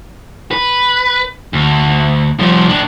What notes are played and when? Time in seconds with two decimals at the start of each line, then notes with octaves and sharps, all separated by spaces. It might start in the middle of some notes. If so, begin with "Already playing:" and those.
0.51 B4
1.53 D2
2.39 F3 G3
2.69 A2 D4